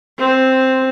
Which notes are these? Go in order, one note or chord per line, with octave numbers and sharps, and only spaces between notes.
C4